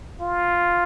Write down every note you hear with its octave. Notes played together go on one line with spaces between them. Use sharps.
F4